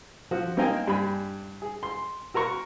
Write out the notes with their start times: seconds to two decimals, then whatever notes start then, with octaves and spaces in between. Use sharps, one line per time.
0.31 F3 F#4
0.57 A#3 C4 D#4 A#4 G5 G#5
0.88 G2 G#5 B5
1.62 G#4
1.83 C6
2.34 F#4 A#4 A#5 C#6